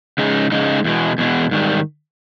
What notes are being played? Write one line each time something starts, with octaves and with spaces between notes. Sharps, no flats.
C#3 G#3 D#4
C#3 G#3 D#4
E2 B2 G#3
E2 B2 G#3
G#2 D#3 G3